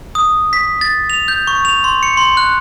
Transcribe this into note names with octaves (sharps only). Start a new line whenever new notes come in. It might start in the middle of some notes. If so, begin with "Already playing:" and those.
D#6
B6
A6
F7
G6
C#6
F7
C6
C#7
C6
F#6